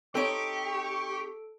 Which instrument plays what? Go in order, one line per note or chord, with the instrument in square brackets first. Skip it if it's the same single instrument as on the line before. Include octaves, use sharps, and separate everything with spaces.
[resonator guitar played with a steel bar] C4 D#4 C#5 [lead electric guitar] G4 [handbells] A4 D7 [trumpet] C#6